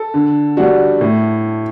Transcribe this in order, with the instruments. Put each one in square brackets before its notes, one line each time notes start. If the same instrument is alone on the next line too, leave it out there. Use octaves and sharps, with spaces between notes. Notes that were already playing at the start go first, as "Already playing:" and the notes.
Already playing: [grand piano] A4
[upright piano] D3
G3 D4 F#4
A2